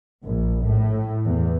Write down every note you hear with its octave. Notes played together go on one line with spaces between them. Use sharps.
A#1
A2
E2